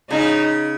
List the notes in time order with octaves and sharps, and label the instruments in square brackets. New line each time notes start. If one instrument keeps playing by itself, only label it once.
[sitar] C#3 [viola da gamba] D#4